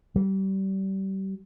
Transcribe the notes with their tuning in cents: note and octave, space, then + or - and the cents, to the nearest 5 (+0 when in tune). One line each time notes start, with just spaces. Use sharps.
G3 -30